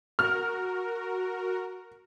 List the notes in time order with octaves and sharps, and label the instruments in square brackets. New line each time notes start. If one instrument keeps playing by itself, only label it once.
[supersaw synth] F#4 A#4 [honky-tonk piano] F6